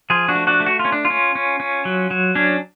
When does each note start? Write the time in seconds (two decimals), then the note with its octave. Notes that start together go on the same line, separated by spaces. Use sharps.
0.10 F3 F4 G#4
0.28 D4 F#4
0.35 A3
0.47 D4 F#4
0.60 A3
0.66 F#4
0.79 F4
0.85 C#4
0.92 D4
1.05 F4
1.10 C#4
1.35 C#4
1.60 C#4
1.85 F#3
2.11 F#3
2.35 C#4 D4